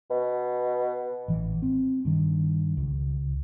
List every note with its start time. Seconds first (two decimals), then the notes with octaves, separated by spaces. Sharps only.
0.10 B2
1.28 A1 E3
1.62 C4
2.05 G2 D#3
2.77 C#2